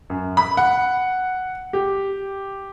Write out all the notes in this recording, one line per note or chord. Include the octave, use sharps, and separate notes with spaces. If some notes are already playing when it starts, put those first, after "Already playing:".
F#2
B5
F#5
G4